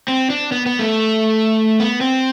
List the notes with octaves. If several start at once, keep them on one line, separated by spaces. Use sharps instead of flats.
C4
D4
B3
B3
A3
B3
C4